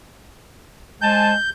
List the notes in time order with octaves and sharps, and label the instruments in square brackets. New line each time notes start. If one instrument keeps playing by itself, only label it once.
[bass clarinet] G#3 [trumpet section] C5 G#5 A5 [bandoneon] G6